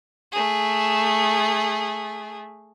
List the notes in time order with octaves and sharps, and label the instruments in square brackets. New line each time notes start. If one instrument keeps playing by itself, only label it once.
[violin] A3 G#4